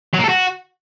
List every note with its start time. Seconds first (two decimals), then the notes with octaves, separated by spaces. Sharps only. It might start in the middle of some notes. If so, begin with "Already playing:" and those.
0.14 F#3
0.19 A#3
0.24 A4
0.29 F#4